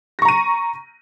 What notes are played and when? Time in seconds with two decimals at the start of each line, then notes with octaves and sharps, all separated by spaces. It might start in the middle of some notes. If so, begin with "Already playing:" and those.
0.19 A#6
0.22 C#6
0.25 A#5
0.28 D#7